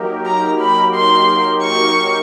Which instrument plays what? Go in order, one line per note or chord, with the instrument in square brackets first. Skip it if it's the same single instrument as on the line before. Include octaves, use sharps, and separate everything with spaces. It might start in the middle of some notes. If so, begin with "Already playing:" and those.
Already playing: [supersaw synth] F#3 A#3 D#4 G4 A#4
[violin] A#5
B5
C6
C#6